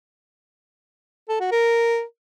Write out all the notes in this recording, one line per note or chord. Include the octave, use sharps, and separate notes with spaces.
A4
F#4
A#4